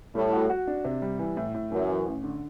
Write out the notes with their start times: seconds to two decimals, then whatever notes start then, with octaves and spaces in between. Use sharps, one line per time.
0.15 A2 G3
0.33 F#4
0.50 F#4
0.67 D4
0.85 C3
1.02 G3
1.19 E3
1.37 A2
1.54 A2
1.72 F#2 E3
1.89 E3
2.06 A1
2.24 D3